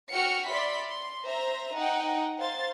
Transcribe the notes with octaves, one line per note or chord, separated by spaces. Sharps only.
F#4 F#5 G5 F6 C#7
D5 E5 B5 C6 B6
C6
C5 E5 A#5
D#4 F#5 G5
C5 F5 C6 A6